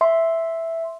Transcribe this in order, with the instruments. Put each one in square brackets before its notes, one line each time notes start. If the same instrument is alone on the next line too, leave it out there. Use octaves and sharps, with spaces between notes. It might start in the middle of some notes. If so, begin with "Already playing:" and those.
[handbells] E5 C6